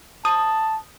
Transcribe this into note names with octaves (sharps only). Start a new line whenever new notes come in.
A5 D#6